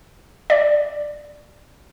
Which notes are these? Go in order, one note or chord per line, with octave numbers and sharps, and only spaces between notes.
D5